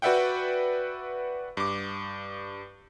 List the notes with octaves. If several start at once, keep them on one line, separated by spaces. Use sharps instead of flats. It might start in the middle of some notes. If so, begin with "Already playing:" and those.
F#4 B4 D5 E5 F#5 G5
G2 D6